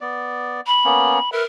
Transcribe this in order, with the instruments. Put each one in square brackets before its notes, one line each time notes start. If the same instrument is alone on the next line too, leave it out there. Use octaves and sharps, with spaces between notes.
[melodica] B3 D5
[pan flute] B5
[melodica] A#3 B3 C#4
[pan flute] A#4 [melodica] B4 E5